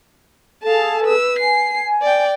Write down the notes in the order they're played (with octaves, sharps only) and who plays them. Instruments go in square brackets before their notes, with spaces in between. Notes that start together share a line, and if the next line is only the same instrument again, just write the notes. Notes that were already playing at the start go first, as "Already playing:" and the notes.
[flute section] G#4 A4 [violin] F5 A5
[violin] B4 E6
[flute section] G#5 [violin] C7
[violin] D5 G5